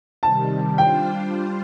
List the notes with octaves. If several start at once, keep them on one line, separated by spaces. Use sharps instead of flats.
C3 D#3 G3 A5
G3 D4 F4 C5 G5